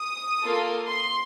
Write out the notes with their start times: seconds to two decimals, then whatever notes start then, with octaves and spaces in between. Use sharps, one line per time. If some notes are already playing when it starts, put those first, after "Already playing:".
Already playing: D#6
0.41 A#3 F4 A4
0.88 C6